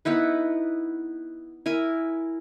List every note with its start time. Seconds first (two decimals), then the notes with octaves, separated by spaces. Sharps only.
0.05 B3 D#4 E4 B4
1.66 E4 A#4 G#5